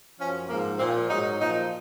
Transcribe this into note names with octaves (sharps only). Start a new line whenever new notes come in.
F#2 F3 C#4
G#2 F3 A#3
A#2 F3 C4
G#2 F#3 D#4
A#2 F3 D#4